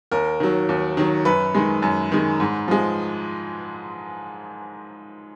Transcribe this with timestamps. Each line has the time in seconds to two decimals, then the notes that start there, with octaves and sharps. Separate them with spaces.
0.12 D#2 A#4
0.40 D#3 F#3
0.69 D#2
0.97 D#3 F#3
1.25 F#2 B4
1.55 D#3 G#3
1.82 F#2
2.12 D#3 G#3
2.40 G#2
2.68 F3 G#3